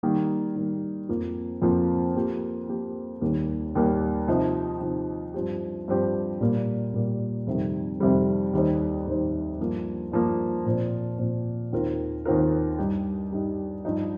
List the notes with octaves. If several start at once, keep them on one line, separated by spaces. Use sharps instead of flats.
D#3 G3 A#3
D#3 G3 A#3
F2 F3 A#3 F4
F2 F3 A#3 F4
F3 A#3 G4
F3 A#3 G4
D#2 D#3 G3 A#3
D#2 D#3 G3 A#3
C3 F3 D#4
C3 F3 D#4
G2 F3 C4 G4
G2 F3 C4 G4
A#2 G3 A#3
A#2 G3 A#3
F2 C3 D#3 G3
F2 C3 D#3 G3
D#2 D#3 G3 D#4 C5
D#2 D#3 G3 D#4 C5
G2 F3 A#3
G2 F3 A#3
A#2 F3 C4
A#2 F3 C4
D#2 D#3 C4 F4 A#4
D#2 D#3 C4 F4 A#4
G2 G3 D#4 G4
G2 G3 D#4 G4
G2 F3 D#4